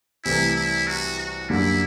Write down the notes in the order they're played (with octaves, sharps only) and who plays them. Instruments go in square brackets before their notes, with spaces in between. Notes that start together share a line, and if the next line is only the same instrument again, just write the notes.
[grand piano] C2 C3 E3 A3 [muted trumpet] E4
[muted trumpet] E4
F#4
F#4
[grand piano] F#2 D3 G3 A#3 [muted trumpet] E4